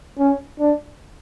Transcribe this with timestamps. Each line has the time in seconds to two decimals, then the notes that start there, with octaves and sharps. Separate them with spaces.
0.19 C#4
0.60 D4